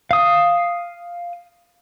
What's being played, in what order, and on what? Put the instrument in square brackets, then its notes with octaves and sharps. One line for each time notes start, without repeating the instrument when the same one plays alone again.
[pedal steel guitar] F5 D#6